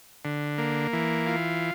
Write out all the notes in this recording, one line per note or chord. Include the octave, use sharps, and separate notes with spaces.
D3
A#3
E3
F4